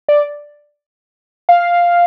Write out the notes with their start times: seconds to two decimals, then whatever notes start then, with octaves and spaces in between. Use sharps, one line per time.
0.09 D5
1.49 F5